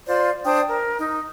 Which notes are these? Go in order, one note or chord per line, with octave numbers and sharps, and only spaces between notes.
F4 C5 D5 C6
D4 C5 G5 D#6
A#4
D#4